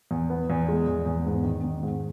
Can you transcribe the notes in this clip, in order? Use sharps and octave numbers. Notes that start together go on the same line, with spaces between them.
E2
B3
E2
G#3
E2
E2
G#2
D#3
D#3
G#2